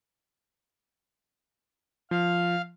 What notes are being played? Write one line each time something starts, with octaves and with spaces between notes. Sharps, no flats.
F3 F5